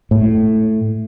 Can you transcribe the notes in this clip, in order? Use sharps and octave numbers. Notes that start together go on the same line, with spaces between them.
A2